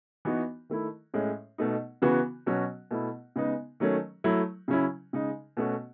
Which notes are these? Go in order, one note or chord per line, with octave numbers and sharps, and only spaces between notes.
E3 B3 D#4 F#4
D#3 A3 E4
A2 G#3 C#4
B2 A3 D#4
C#3 E3 B3 F#4
B2 F#3 C#4 F#4
B2 A3 E4
C#3 G#3 B3 D#4
D#3 F#3 A3 C#4
F#3 A3 E4
C#3 F#3 C#4 E4
C#3 G#3 D#4
B2 A3 C#4 F#4